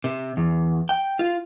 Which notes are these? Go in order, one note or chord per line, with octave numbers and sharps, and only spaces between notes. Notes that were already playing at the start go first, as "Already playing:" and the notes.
C3
E2
G5
F4